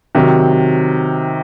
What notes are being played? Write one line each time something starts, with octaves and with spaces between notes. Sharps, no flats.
C3 D#3 F#3